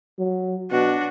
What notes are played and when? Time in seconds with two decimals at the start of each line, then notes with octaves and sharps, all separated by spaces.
0.19 F#3
0.71 B2 D4 F#4